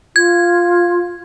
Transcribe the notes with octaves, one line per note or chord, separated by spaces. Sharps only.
F4 G#6